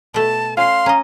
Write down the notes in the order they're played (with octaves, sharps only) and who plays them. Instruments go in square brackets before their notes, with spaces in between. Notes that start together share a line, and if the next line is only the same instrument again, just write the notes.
[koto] B2 A3 [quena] A5
[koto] C#4 [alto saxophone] F5 [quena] C6
[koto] C#4 D#5 [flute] A#5